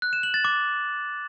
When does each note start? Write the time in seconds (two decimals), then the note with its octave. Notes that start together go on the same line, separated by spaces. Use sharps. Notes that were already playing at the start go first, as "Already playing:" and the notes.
0.02 F#6
0.13 E7
0.23 F#7
0.34 A6
0.45 D6